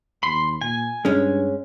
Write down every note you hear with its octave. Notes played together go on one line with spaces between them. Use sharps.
D#2 B5 C6
A#2 G#5
G2 G#3 C#4